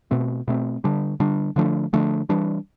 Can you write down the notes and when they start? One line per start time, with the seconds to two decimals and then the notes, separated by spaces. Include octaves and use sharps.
0.11 B2 A3 C4
0.48 B2 A3 C4
0.84 D3 G3 D4
1.20 D3 G3 D4
1.56 D3 F3 A3 D4
1.93 D3 F3 A3 D4
2.29 E3 G3 D4